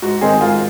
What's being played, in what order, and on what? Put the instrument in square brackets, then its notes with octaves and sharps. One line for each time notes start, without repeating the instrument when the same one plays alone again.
[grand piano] G#2 F#4
D#3 G#3 C4 G#4
G#2 F4